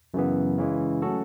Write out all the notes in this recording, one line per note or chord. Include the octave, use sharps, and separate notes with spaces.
F#2 C#3 E3 B3
C#3 E3 G#3
F#3 A3 C#4 F#4 A4